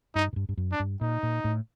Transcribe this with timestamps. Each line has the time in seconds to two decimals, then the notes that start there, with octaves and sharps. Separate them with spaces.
0.15 G2 D#4
0.33 A2
0.36 G2
0.49 G2
0.57 F#2
0.72 D4
0.80 G2
1.01 A#2 D#4
1.23 A#2
1.44 A2